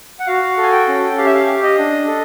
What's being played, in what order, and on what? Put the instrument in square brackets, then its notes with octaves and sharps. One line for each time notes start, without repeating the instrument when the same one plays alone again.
[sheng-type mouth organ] F#5
F#4 F5
A4
G#5
G5
C#4
G4 F5
E5
F5
G4
D#5
D4
A4